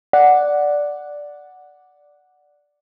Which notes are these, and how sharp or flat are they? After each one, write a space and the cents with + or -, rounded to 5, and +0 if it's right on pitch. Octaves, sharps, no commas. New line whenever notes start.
D5 +0 F#5 +0